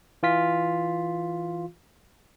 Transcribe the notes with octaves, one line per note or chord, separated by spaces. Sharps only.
E3 F4 B6